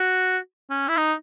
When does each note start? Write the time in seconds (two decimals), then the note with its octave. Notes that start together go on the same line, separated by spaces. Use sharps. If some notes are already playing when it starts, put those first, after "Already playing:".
Already playing: F#4
0.70 C#4
0.89 E4
0.97 D#4